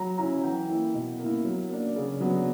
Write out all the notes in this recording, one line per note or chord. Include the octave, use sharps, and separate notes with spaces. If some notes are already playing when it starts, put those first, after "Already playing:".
Already playing: F#3 A#5
C#4 E4 A#5
E3 G5
A#3 E4
B2
A#3 E4
F#3
A#3 D4
C#3
F#3 B3 D4